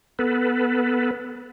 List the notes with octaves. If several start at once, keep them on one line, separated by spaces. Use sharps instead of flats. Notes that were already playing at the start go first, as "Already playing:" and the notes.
B3 A4 B4